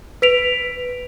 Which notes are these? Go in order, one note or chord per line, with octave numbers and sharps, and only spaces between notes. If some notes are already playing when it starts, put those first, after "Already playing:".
B4 B6 D7 F7